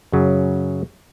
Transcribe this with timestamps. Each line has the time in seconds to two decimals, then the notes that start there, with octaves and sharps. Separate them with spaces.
0.12 F#2 C#3 F#3